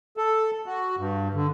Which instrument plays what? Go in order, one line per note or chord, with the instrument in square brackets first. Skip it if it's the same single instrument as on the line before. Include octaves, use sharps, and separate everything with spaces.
[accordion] A4
F#4
G2
D3